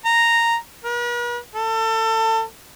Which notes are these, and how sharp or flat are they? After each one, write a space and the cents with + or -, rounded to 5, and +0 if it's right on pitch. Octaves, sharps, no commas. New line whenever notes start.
A#5 -5
B4 -45
A4 +30